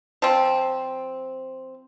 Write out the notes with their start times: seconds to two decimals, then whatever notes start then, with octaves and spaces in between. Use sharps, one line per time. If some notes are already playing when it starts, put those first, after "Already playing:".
0.22 F3 C4